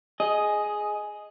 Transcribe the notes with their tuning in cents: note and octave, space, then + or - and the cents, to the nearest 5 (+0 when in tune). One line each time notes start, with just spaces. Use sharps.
G#4 +10 D#5 +0